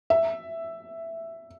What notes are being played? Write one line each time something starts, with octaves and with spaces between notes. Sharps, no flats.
E5